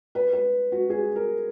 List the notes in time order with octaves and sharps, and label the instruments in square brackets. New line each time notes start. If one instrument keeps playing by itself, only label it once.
[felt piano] B4
B4
F#4
G#4
A#4